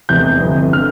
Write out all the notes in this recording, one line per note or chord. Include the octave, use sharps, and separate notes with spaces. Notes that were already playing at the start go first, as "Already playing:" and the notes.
F1 E2 C3 G6
G1 F2 C3 E3
D3 F6